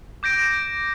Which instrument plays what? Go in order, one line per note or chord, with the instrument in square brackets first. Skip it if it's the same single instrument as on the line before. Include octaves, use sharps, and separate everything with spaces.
[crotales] D6 G6 A#6 D7